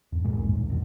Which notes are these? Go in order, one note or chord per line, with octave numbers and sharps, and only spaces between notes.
E2 G2
A#2 G#3
C2 F2 G#2
D#2 A#2
A1 E2 B2